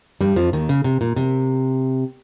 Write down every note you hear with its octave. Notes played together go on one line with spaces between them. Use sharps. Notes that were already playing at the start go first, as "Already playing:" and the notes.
G2 G3
F2 F3
D#2 D#3
C#3
C3
A#2
C3